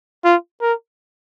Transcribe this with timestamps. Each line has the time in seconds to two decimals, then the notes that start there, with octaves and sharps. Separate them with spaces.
0.24 F4
0.61 A#4